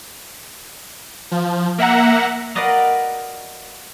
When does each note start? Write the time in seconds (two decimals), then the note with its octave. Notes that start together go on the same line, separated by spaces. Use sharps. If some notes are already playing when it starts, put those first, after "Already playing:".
1.31 F3
1.78 A#3 E5 F#5 A#5
2.55 F#4 A#4 B4 D5 D#5 F5